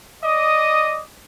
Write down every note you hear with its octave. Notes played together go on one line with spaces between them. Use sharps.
D5 D#5 D6 D#6